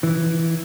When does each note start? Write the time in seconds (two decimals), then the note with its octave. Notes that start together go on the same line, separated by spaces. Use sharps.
0.03 E3